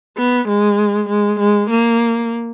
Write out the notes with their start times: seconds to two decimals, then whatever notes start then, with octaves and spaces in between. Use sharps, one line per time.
0.17 B3
0.48 G#3
1.08 G#3
1.39 G#3
1.70 A#3